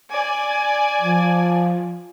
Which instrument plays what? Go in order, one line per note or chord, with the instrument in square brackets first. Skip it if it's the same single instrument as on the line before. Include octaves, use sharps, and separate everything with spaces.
[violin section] D5 G#5
[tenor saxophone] F3